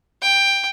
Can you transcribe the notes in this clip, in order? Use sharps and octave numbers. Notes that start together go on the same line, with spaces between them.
G5